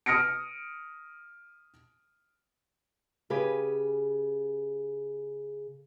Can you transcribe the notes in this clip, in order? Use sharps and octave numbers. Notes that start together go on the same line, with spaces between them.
D#6 F6 A#6 C#7 D7
C#3 G4 G#4 B4